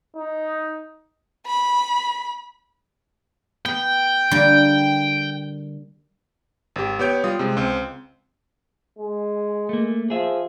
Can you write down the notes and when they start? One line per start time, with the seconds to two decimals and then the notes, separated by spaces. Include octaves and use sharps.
0.17 D#4
1.47 B5
3.66 B3 G5
4.31 D3 G3 A#3
6.76 G#1 G4
6.99 B3 G4 C#5 G6 D7
7.24 G3 F4 D#6
7.39 C3 G#3
7.57 C#2 C4
8.99 G#3
9.69 A3 A#3
10.10 F3 G#4 E5